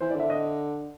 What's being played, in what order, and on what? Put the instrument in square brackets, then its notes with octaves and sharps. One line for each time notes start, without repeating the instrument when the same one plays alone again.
[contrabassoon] E3 [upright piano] C5
[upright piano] D5
[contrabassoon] D3 [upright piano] E5
[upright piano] D#5